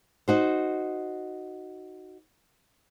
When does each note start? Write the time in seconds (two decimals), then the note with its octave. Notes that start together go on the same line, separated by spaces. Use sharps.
0.28 D#4 F#4 C5